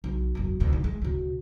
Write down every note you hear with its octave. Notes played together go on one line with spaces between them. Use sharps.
B1
E1 F#2
D2 B2
D#4
G#3
D2 B2